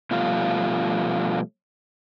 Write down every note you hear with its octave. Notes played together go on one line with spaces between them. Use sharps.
B2 F3 G3 A3 F4